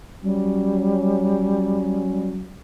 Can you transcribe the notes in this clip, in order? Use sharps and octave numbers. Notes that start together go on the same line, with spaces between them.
F#3 G3 C#4